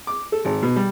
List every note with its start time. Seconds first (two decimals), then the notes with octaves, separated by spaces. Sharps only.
0.07 D6
0.32 A4
0.45 G#1
0.62 B2
0.76 G3